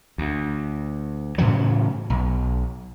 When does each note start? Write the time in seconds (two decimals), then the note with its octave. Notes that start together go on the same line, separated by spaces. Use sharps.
0.18 D2
1.38 A2 C#3 E3 F#3
2.10 B1